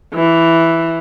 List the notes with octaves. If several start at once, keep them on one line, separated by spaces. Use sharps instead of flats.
E3